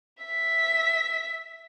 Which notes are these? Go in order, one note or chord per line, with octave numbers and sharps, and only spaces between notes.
E5 B6